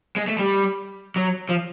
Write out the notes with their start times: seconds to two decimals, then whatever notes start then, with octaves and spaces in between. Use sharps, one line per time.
0.16 G#3
0.28 A3
0.39 G3
1.16 F#3
1.49 F3